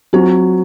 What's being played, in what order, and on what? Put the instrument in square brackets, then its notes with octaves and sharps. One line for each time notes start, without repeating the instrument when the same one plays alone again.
[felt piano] F#3 [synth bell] C4 F4 C5